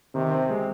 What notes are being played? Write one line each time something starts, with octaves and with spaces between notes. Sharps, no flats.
C3 D#3
C4
G#3